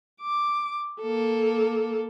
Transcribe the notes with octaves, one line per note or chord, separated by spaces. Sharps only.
D6
A#3 A4